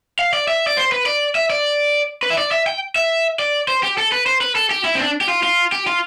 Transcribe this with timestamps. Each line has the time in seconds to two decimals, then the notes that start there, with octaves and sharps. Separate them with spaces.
0.19 F5
0.33 D5
0.48 E5
0.67 D5
0.77 C5
0.92 B4
1.06 D5
1.35 E5
1.50 D5
2.23 B4
2.30 E5
2.38 D5
2.52 E5
2.66 G5
2.96 E5
3.39 D5
3.68 C5
3.83 G4
3.98 A4
4.12 B4
4.26 C5
4.41 B4
4.55 A4
4.71 G4
4.85 E4
4.95 C4
4.99 D4
5.21 G4
5.29 F4
5.43 F4
5.72 G4
5.87 F4